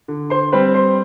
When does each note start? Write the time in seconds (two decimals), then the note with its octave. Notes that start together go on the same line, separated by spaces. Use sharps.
0.08 D3
0.30 C5 C6
0.52 G3 C4 B4 B5
0.74 C5 C6